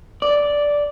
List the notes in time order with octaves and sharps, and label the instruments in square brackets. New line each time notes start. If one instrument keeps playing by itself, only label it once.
[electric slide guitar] D5